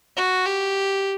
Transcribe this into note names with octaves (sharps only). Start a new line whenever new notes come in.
F#4
G4